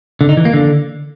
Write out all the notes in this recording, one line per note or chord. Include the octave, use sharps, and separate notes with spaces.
D3
D#4
E3
A#3
D3